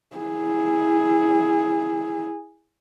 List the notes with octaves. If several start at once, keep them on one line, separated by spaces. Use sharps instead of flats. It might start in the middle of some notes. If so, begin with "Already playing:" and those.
E4 G#4